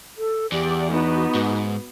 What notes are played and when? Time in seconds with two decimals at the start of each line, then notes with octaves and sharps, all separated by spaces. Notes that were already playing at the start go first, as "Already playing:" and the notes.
0.17 A4
0.52 E2 G4 D5
0.91 B3 D#4 F#4
1.34 G#2